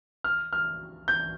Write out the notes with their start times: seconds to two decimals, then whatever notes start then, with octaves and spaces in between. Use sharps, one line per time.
0.24 F6
0.53 F6
1.08 G6